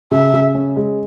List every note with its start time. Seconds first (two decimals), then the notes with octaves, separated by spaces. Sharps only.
0.11 C#3 E5
0.33 C#3
0.55 C#4
0.76 G#3